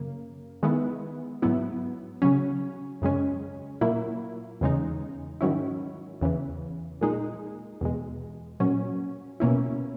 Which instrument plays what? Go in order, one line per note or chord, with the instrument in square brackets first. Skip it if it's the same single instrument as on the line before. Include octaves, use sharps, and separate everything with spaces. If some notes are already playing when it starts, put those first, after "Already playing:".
Already playing: [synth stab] F#2 C#3 A#3
D#3 G#3 B3 E4
G#2 F#3 B3 E4
C#3 F#3 C#4
F#2 C#3 G#3 C#4
A#2 F#3 A#3 E4
E2 C#3 G#3 D#4
G#2 D#3 F#3 C#4 E4
E2 C#3 E3
A#2 G#3 D#4
E2 B2 G#3
A#2 F#3 C#4
B2 A#3 C#4 E4